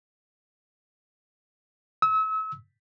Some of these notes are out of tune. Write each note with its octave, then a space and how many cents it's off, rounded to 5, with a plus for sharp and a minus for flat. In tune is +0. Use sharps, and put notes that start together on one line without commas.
E6 -35